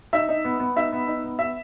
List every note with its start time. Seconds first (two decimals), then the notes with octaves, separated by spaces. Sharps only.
0.13 D#4 E5
0.29 D#4
0.45 B3
0.60 B3
0.76 D#4 E5
0.93 B3
1.07 D#4
1.24 B3
1.39 B3 E5